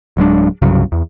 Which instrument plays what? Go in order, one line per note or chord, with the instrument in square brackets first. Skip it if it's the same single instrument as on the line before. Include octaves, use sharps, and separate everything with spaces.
[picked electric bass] D1 F#3 G#3 D4
C2 G2 C#3 F#3
E2